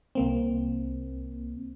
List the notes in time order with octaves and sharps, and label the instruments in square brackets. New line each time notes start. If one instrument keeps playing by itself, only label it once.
[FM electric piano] C2 A#3 C4